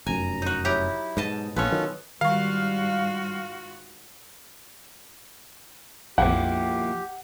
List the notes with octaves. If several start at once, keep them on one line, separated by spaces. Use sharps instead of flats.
F1 F#2 G#5 A#5
D#4 F#4
F#3 E4 G4 A#5
G#2 B2 D#5 A5
A#1 B3 C#4 F4 A4 C#5
D#3 F#3
G#2 D#3 G3 F4 F#4 F5 C#6
A#1 F2 F3 A#3 E4 G4 F#5